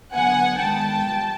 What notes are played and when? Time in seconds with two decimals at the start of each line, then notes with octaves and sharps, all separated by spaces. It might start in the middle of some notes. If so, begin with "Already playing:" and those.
0.14 D3 F#3 B3 F#5 G#5
0.58 D#3 G#3 B3 G5 A5
1.04 A#2 G3